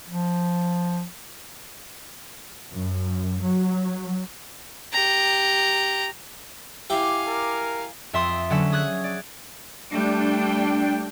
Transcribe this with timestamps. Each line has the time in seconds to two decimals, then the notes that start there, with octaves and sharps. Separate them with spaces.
0.08 F3
2.73 F#2
3.43 F#3
4.93 G4 A#5
6.90 E4 G4 F5 G#5 D6
7.27 A#4
8.13 F2 E5 C6 D#6
8.50 D3 F#3 C#4 E5
8.72 G#4 D#6 F#6 G#6
9.04 D5
9.91 G3 A3 D4 G5